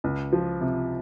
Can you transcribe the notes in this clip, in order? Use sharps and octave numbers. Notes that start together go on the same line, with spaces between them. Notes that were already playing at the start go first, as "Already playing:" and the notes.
C#2
F3
C3